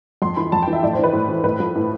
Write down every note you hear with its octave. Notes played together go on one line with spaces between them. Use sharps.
F2 C6
E3 B5
F2 A5
G5
E3
E5
A2 D5
C5
E3 B4
A2
E3
A2 B4
F3
A2